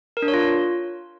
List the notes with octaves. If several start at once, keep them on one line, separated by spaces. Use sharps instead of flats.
A#4
D4
C#5
F4